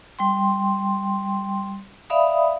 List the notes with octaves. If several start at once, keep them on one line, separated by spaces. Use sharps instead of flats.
G3 G5 C6
D5 E5 F5 B5 D#6